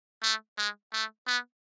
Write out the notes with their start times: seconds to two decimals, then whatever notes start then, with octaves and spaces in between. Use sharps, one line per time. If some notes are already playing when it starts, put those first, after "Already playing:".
0.23 A3
0.57 G#3
0.93 A3
1.27 B3